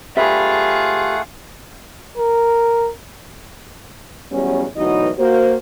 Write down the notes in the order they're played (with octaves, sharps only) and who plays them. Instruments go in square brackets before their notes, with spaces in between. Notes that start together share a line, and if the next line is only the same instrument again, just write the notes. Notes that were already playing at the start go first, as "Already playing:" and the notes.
[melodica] A3 F#5 [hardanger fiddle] F4 G#4 [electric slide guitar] G4 B4 [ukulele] E5
[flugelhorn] A#4
[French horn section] E2 F#3 G3 B3 C#4
D2 B2 E3 F#3 D#4 D#5
A#3 F#4 C5